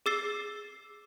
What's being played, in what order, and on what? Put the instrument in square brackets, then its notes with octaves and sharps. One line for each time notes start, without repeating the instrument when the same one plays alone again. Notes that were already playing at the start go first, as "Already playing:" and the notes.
[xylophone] G#4 D6 E6 A6 C7 G7